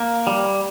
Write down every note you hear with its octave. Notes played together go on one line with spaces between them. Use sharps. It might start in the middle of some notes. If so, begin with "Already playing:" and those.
Already playing: A#3
G3